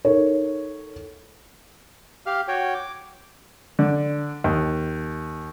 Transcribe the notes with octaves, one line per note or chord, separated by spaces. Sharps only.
D#4 A4 A#4 C#5
G4 F5 F6
F#4 C#5 G5
D6
D3
D#2